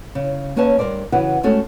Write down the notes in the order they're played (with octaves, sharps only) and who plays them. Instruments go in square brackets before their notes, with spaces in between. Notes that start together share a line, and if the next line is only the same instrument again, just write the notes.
[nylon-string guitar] C#3
A#3 C#4 B4 C#5 A5
G2 A#2 A#4 C5 D5
C#3 E3 F#4 B4 F#5
G#3 A3 C#4 F#4 A4